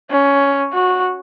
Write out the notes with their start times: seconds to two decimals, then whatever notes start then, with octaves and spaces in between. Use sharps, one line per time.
0.10 C#4
0.73 F#4